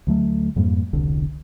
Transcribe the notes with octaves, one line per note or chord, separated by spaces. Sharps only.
D2 F#3 A3
F2 G#2 G3 A#3
E1 C2 D3